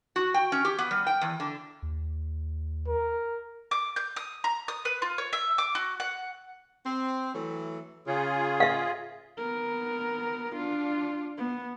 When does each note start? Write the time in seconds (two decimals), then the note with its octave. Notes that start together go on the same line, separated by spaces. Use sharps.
0.16 F#4
0.34 G5
0.52 C#4
0.65 G4
0.78 B3
0.91 G3
1.07 G5
1.21 E2
1.40 D3
1.82 D#2
2.87 A#4
3.71 D6
3.96 G6
4.16 D#6
4.44 A#5
4.68 D#6
4.85 B4
5.02 F4
5.18 C#5
5.33 E5
5.58 D6
5.75 F#4
6.00 F#5
6.85 C4
7.34 E3 F#3 A3
8.07 C#3 F4 G#4
8.60 E5 F5
9.38 B3 A#4
10.56 D4 F4
11.38 B3